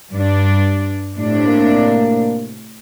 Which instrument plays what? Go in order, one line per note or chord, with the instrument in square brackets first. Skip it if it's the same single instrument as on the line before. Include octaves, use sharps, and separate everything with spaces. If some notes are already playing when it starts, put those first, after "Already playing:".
[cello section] G2 D4
A2 C3 D4
[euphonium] A#3